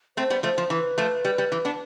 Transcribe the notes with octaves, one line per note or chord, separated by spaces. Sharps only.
A3 C4 C5
G3 B3
F3 A3 C5
F3
E3 B4
F3 A3
G3
G3
E3
B3 D4